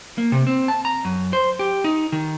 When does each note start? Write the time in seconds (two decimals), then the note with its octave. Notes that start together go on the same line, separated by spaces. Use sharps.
0.18 A#3
0.32 C3
0.47 C4
0.68 A5
0.85 A#5
1.05 F#2
1.33 C5
1.59 G4
1.84 D#4
2.12 D#3